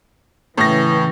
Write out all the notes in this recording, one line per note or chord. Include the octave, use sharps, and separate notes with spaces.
A2 C#3 E3 A#6